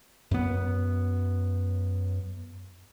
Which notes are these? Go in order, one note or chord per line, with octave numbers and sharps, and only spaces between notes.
F#2 B3